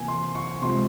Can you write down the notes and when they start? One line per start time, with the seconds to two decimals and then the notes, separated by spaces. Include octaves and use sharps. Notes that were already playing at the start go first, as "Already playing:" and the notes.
Already playing: C3 E3 A#3 G#5
0.08 C6
0.35 C#6
0.62 C3 F3 G#3 C6